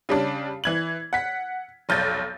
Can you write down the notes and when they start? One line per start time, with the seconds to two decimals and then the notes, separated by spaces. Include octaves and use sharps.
0.09 C#3 G3 D4
0.64 E3 G#6 F#7
1.13 F#5 B6
1.89 F1 B1 G6 A6